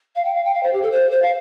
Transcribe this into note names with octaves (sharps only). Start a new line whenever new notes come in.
F5
G5
F5
G5
F5
C5
G4
A4
C5
C5
F5